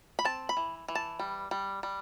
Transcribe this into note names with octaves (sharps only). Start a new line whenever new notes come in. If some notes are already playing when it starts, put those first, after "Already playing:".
B5
C4 A5
B5
E3
E3
A5
G3
G3
G3